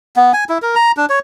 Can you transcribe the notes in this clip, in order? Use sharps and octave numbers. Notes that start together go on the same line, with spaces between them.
B3
G#5
E4
A#4
A#5
D4
C#5